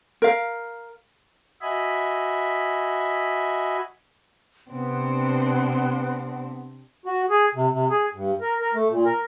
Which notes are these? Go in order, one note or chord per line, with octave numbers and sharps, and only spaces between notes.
A#4 F5
F#4 D#5 E5 G#5 B5
C3 B3 C4 D4
F#4
G#4
C3
C3
G#4
G2
A#4
A#4
A3
A#2
A#4